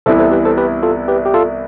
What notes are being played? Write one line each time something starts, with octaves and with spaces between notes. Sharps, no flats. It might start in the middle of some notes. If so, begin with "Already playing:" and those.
C2 C3 E3 B3 E4 A4 C5
A4 C5
G4 B4
A4 C5
G4 B4
F4 A4
G4 B4
G4
F4 A4